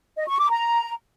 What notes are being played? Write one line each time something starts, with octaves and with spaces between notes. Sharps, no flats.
D#5
C#6
D6
A#5